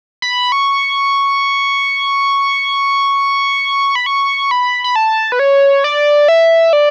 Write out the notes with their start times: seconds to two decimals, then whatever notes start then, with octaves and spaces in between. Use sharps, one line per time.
0.22 B5
0.52 C#6
3.95 B5
4.06 C#6
4.51 B5
4.84 B5
4.96 A5
5.32 B4
5.39 C#5
5.84 D5
6.28 E5
6.73 D5